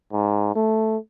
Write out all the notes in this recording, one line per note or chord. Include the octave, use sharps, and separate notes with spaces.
G#2
A3